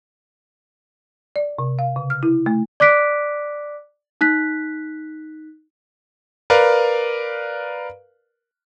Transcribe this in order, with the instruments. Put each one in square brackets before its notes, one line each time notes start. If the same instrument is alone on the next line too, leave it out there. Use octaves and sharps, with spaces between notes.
[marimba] D5
C3
F5
C#3
F6
E4
A3
[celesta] D5 D6 F#6 B6 D7
D#4 F#6 B6
[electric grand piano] A#4 B4 D5 F5